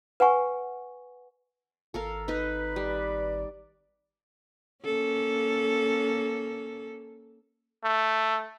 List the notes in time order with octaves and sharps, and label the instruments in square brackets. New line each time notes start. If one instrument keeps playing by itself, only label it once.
[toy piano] B4 F#5 G#5 C#6
[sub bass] G#1 [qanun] A4 A#4 F5
[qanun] D#4 D#5 [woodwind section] B4
[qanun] G3 [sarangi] D5
[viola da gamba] A#3 C#4 A4
[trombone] A3